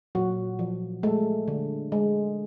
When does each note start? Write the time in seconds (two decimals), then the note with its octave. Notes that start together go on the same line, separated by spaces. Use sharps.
0.15 A#2 F#3 F#4
0.59 F3
1.03 G#3 A3 A4
1.48 D3
1.92 G#3